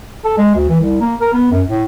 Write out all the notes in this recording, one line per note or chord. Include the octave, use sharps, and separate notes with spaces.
A4
G#3
D2
E3
C2
A#3
A#4
B3
F#2
A2